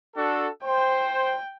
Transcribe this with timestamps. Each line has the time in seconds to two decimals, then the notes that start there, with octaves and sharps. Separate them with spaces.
0.16 D4 F#4 A4
0.64 C5 G5